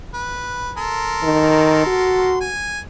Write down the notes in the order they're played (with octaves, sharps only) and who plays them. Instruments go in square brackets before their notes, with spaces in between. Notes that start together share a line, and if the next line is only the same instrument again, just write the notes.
[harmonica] B4
A4 A#4 C6
[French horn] D#3
F#4
[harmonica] G#5